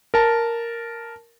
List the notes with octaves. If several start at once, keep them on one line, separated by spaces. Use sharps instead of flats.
A#4 A5